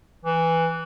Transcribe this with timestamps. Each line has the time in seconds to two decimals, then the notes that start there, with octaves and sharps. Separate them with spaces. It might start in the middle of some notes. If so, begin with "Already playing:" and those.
0.25 E3